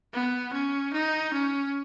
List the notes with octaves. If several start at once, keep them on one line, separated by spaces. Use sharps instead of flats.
B3
C#4
D#4
C#4